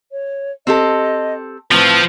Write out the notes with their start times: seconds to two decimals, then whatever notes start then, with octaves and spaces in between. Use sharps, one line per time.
0.12 C#5
0.67 C4 G4 A4 D#5
1.71 A2 F3 C4 B4